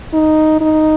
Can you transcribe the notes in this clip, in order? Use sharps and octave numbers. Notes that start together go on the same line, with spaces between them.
D#4
D#4